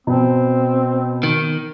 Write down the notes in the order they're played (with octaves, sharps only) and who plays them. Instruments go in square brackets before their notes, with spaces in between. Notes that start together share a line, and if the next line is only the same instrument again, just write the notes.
[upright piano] B2 [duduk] C4
[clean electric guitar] D#3